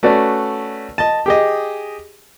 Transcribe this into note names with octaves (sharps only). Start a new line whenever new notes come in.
A3 C#4 F#4 B4 D5
D#5 A5
G4 G#4 D#5